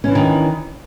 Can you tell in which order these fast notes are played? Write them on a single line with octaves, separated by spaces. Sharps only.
C#4 E3 D4 D#3